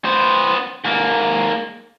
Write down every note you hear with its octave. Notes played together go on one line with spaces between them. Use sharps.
B3 C5
G#2 A#3